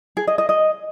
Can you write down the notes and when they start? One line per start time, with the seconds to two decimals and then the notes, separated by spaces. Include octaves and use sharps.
0.17 G#4
0.27 D#5
0.38 D#5
0.49 D#5